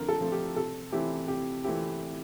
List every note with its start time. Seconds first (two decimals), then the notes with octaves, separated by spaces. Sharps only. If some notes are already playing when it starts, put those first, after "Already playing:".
Already playing: D3 F3 A3 C4 A#4
0.08 A4
0.20 F3 A3 C4
0.32 G4
0.56 C3 A4
0.92 E3 A3 C4 E4 G4
1.28 C3 G4
1.64 E3 A3 C4 E4 G4